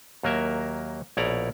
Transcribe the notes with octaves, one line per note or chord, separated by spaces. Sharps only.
D#2 F#3 A#3 A#4 E5
A#1 B2 E4 C#5 D5 A#5